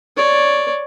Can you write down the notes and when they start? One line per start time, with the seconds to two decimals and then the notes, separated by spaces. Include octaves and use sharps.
0.17 C#5 D5